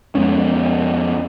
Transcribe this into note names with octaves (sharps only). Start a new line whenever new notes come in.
F2 G#3 B3 C#4